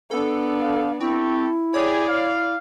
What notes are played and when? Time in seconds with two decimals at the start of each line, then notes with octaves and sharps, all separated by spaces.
0.11 B3 D4 A4
0.60 F5
1.00 C4 E4 G4 A4 C#6
1.74 G4 G#4 C#5 D5
2.07 F5